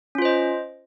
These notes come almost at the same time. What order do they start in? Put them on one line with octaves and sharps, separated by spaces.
C#4 F4 C5 D#5